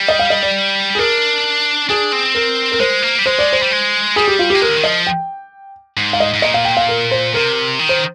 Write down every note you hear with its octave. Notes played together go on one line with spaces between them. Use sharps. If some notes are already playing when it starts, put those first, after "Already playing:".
Already playing: G3
D#5
F5
D#5
D5
G#4
D4 A#4
D4 G#4
C4
A#4
A#4
G#3 C5
A#3
G3
G#3 C5
D5
C5
G3
G#3
G3 G#4
G4
F4
G4
A#3
G#3 A#4
D3
D#3
F3 D#5
G5
G#2
F5
D#5
G#2
A#2 D#5
F5
G5
F5
A#4
C5
C3 A#4
D#3
C5